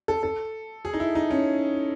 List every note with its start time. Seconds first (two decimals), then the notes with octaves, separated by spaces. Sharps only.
0.08 A4
0.23 A4
0.85 G#4
0.93 D#4
1.00 E4
1.15 D#4
1.30 C#4